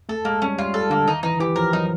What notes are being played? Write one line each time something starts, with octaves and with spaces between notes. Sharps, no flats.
A3 A4
G#3 A#3
G3 C#4
G3 F4
G3 A4
D3 A#3
D#3 D#4
E3 D#4
E3 G4
F3 A#4
F#3 D#4